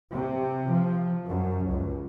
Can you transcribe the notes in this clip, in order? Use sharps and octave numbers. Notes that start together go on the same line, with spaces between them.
C3
F3
F#2
C#2